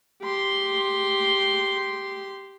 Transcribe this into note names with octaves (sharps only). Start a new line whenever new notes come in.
G4 C6